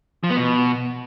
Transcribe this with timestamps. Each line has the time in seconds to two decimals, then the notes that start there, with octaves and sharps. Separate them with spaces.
0.24 F3
0.30 B3
0.36 B2